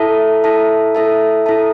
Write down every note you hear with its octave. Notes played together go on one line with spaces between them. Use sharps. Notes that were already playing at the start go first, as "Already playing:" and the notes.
Already playing: E4 A4 E5 A5
E4 A4 E5 A5
E4 A4 E5 A5
E4 A4 E5 A5